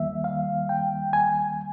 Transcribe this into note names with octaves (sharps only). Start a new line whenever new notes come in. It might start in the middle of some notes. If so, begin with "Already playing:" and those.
Already playing: D#2 D#3 G3 A#3 E5
F5
G5
G#5